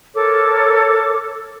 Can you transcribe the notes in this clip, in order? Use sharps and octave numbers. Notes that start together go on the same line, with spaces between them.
A4 A#4 C#5 D6